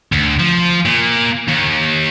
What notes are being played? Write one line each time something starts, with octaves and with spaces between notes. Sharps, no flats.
D2
F3
A#2
D#2